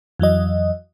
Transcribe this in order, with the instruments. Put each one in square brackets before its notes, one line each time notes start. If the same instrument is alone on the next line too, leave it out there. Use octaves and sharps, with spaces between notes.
[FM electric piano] F2 E3 F#3 D#5